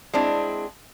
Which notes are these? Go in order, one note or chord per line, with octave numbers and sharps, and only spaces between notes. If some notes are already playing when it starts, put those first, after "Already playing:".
G#3 C4 D4 E4